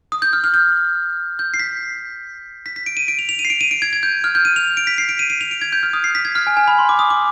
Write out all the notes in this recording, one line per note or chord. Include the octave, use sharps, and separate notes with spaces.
D#6
G6
F6
F6
G6
G6
C7
B6
B6
B6
D7
D#7
D7
F7
F7
D#7
C7
D7
D#7
D7
G#6
G#6
G6
F6
G6
D#7
F7
D7
B6
C7
D7
D#7
D#7
F7
D7
G#6
G6
F6
D#6
C7
B6
G#6
F6
G#5
G#5
B5
C6
D6
D#6
D6